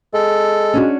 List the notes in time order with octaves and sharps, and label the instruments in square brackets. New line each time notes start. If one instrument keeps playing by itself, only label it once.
[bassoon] G#3 [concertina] A4
[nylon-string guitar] C#4 D4 F#4